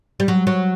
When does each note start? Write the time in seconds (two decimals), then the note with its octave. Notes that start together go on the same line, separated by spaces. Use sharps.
0.20 G3
0.28 F#3
0.47 F#3